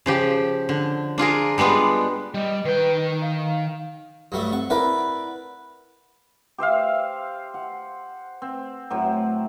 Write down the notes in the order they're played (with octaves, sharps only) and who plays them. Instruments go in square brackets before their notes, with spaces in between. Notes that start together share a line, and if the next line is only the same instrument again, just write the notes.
[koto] C#3 F3 G4
D3
D4 F4 G#4 A#4
G3 G#3 B3 D4 F4
[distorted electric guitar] G3 [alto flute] D#5
[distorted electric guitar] D#3 G5 [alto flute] B4
[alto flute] F5
[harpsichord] G2 F#3 A3
[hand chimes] C4 F#5 [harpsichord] C#6
[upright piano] E4 A#4 [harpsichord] B4 D5 [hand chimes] F#5 B5
[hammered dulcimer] G4 C5 E5 F5
F#5
C4
A2 F#3 C4